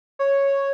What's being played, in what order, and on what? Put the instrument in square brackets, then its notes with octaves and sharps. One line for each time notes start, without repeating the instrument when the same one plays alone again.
[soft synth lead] C#5